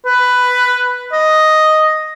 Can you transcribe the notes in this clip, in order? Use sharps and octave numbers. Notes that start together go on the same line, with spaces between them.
B4
D#5